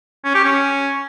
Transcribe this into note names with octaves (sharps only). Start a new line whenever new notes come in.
C#4
G4
C#4